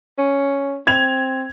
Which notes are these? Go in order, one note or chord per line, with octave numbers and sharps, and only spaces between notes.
C#4
C4 G#6 F7